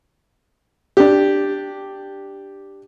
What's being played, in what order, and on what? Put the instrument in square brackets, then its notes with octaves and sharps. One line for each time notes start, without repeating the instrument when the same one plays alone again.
[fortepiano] D4 G4